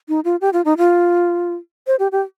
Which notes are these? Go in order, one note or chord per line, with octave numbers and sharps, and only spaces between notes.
D#4
F4
G4
F4
D#4
F4
C5
G4
G4